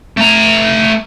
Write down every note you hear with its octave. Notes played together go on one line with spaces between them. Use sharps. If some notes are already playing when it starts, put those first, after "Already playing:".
A3 A#5